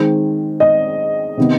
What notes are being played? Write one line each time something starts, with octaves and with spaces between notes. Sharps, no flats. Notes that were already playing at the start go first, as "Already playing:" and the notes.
Already playing: D#3 G#3 C4
D#5
C3 D#3 B3